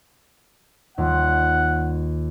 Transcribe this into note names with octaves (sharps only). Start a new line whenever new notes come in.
D#2 G3 F4 F#5